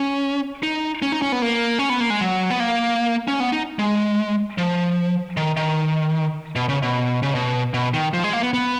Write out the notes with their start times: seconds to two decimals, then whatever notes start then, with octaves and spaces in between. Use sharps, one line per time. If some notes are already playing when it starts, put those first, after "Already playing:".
Already playing: C#4
0.63 D#4
1.02 C#4
1.12 D#4
1.22 C#4
1.32 B3
1.42 A#3
1.79 C#4
1.89 B3
2.00 A#3
2.10 G#3
2.21 F#3
2.50 B3
2.60 A#3
3.28 C#4
3.40 B3
3.52 D#4
3.79 G#3
4.58 F3
5.37 D#3
5.57 D#3
6.56 B2
6.69 C#3
6.82 B2
7.23 C#3
7.35 B2
7.74 B2
7.94 D#3
8.13 F3
8.24 G#3
8.33 A#3
8.43 B3
8.54 B3